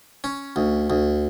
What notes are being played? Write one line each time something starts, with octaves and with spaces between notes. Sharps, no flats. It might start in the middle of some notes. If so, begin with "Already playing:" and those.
C#4
D2
D2